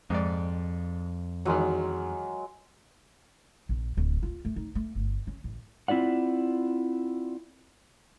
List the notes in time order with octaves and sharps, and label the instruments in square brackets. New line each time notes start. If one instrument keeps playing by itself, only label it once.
[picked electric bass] F2 [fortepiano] G#2 D5
[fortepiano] E2 D#3 [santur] F#3 G#3
[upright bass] A#1
D1
F4
A3
D#4
A3
G1
C#4
A1
[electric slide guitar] C4 E4 F4 D5 F#5